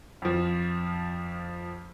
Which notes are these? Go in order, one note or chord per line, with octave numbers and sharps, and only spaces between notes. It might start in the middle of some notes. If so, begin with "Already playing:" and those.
F2 F3